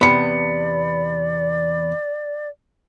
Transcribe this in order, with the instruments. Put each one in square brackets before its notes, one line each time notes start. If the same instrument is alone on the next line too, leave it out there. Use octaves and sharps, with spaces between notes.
[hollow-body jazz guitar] E2 C3 B3 [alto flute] D5 [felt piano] B5 C#7